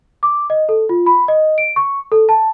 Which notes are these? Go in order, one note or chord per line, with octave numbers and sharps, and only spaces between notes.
D6
D#5
A4
F4
B5
D#5
D7
C#6
A4
A5